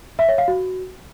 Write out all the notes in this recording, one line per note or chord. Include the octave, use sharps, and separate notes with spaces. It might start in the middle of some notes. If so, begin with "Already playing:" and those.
E5
C#5
F5
F#4